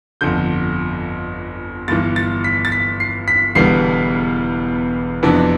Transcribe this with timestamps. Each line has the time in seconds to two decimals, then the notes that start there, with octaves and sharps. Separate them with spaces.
0.21 G1 F2 D3 G6
1.88 G1 G2 E3 A6
2.16 A6
2.44 B6
2.65 A6
2.72 B6
3.00 C7
3.28 B6
3.55 E1 E2 D3 G3 B3 C7
5.23 F2 C3 E3 B3 D4